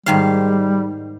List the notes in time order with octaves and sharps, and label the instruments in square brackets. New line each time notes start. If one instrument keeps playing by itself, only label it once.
[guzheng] G#2 D#3 F5 [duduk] G3